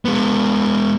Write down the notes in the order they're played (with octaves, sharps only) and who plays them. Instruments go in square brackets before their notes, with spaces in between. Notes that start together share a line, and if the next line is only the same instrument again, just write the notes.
[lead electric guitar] G#3 B3